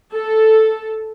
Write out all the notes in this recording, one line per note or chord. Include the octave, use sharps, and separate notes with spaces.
A4